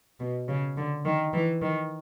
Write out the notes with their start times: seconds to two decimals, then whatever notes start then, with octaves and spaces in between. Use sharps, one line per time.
0.20 B2
0.48 C#3
0.77 D3
1.05 D#3
1.33 E3
1.62 D#3